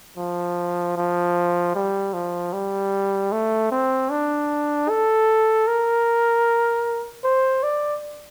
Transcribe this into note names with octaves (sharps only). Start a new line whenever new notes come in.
F3
F3
G3
F3
G3
A3
C4
D4
A4
A#4
C5
D5